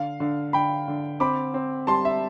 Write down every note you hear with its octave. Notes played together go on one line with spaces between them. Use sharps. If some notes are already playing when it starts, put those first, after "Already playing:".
Already playing: D3 F5
D3
D3 G5 B5
D3
C4 B5 D6
C4
G3 A5 C6
E5